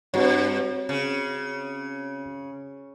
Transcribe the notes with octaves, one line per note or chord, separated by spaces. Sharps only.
G2 C4 F#4 C#5
C#3